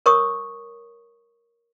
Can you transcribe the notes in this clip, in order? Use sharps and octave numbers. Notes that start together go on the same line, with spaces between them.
A#4 C#5 C#6 D#6